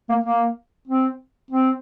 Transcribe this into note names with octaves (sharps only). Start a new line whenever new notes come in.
A#3
A#3
C4
C4